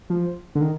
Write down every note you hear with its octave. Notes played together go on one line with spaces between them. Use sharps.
F3
D3
D#3